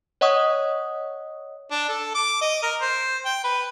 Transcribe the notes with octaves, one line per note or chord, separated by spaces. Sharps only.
C#5 D#5 F#5 C#6 D#6
D4
A4
D6
D#5
A#4
C5
G5
B4